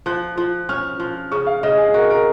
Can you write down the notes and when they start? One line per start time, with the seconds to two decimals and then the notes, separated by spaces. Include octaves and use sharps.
0.06 F3 F#6
0.38 F3
0.69 C#4 F6
1.00 F3
1.32 C#3 C#6
1.47 F5
1.63 C#3 D#5
1.78 G#4
1.94 F#4 A#4
2.10 A#4